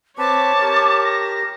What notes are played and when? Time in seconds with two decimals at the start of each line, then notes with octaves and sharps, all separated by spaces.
0.18 C4 B4 C#5 A5 D6
0.61 G4 A#4
1.04 A#6